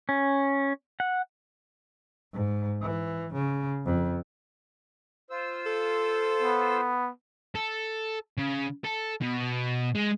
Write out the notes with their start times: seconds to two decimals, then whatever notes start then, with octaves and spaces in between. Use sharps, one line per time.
0.09 C#4
1.00 F#5
2.33 G#2
2.82 E3
3.34 C#3
3.85 F2
5.30 F4 C5 E6
5.66 A4
6.42 B3
7.55 A4
8.39 C#3
8.84 A4
9.21 B2
9.95 G#3